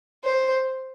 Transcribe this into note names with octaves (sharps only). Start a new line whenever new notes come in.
C5